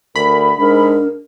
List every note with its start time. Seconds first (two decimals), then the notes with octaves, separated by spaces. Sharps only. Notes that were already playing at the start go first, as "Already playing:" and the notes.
0.16 D2 A#4 B5
0.58 G#2 D4 A#4